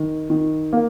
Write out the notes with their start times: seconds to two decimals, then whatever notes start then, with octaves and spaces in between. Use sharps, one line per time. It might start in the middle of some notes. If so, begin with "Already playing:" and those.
Already playing: D#3
0.30 D#3
0.73 A#3